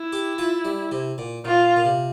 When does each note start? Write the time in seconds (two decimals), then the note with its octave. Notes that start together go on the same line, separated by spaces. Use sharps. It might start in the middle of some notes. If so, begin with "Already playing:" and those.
Already playing: E4
0.13 G4
0.38 F4
0.65 G3
0.91 C3
1.18 A#2
1.45 A#2 F4
1.76 A#2
1.85 C3